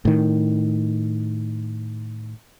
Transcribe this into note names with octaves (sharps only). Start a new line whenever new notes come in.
A2 D#3